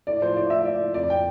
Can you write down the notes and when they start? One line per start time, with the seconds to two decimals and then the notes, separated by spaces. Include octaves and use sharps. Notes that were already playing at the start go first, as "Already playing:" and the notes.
0.07 A2 D5
0.22 F3 C5
0.36 A2 D5
0.50 A2 E5
0.65 A2 D5
0.80 A2
0.94 F2 D5
1.10 G5